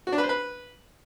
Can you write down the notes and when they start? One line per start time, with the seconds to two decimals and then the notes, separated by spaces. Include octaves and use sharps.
0.07 F#4
0.12 D4
0.18 B4
0.24 C5
0.29 B4